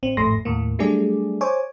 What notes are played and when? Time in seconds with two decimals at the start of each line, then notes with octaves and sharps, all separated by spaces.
0.03 A1 C4
0.17 G#1 F2 A2 A3 C6 A#6
0.45 D#2 A2 A#3
0.79 F#3 G3 A3 D4 G#4 D5
1.41 C5 C#5 G#5 D6